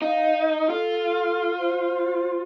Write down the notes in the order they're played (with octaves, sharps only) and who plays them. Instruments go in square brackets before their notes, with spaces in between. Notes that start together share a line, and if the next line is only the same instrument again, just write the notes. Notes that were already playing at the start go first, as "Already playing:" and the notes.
[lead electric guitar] D#4 [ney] F5
[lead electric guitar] F4 [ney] A4
[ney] C5